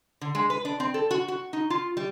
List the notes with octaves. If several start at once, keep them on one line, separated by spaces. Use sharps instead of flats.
D3
G#3
B4
D4
C4
A4
F#4
F#4
D#4
F4
G3